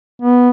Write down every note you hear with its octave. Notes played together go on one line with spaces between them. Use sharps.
B3